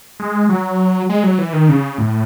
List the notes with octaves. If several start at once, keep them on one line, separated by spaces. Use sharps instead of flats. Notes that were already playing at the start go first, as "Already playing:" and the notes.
G#3
F#3
G#3
F#3
E3
D#3
C#3
A2